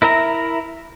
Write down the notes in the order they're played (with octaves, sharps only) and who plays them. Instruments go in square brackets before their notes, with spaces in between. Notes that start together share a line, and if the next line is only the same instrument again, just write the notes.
[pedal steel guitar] E4 A#4 E5 A#5